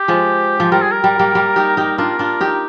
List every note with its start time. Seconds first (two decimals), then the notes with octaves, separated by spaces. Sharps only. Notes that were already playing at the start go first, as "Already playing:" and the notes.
Already playing: G4
0.08 F3 G#3
0.60 F3
0.72 G3 A#4
0.82 G#4
0.91 A#4
1.04 G3
1.19 G3 A#3
1.35 G3 A#3
1.56 D#4 G4
1.77 D#4 G4
1.98 D4 F4 A#4
2.19 D4 F4
2.40 D#4 G4